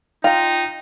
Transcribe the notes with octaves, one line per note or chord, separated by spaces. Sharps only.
D#4 F4 G5 A#5